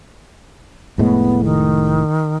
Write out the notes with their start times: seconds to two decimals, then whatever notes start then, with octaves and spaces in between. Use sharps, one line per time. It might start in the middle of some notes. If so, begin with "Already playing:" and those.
0.98 F1 A2 G#3 B3
1.44 D#3